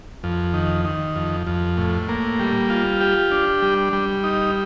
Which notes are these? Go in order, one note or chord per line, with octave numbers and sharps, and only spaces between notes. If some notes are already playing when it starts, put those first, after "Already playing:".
F2
D#3
D#3
F2
F2
A2
A#3
G3
F4
G4
D4
G3
G3
D#4